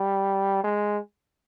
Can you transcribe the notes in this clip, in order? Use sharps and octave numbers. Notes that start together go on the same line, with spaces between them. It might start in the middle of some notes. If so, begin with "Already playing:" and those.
Already playing: G3
G#3